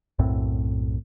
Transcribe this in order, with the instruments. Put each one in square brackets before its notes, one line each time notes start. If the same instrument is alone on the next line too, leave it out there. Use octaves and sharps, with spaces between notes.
[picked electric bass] B1 F#2 A2 C4